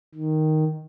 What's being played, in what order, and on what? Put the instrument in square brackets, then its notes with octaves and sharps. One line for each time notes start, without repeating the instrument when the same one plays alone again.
[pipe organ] D#3